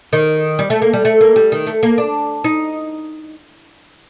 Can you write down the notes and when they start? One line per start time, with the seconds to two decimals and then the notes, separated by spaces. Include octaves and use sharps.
0.13 D#3
0.59 G3
0.70 A3
0.82 A#3
0.93 G3
1.05 A3
1.21 A#3
1.36 G3
1.52 D#3
1.67 A3
1.83 A#3
1.98 D4
2.44 D#4